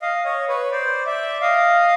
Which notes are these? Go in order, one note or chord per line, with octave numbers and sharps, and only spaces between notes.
D#5 F5
C#5 D#5
B4 C#5
C5 D5
D5 E5
D#5 F5